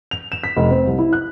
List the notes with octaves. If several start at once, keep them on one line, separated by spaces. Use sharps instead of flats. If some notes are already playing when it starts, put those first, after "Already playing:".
F7
E7
B6
F1
C4
C2
E4
F#6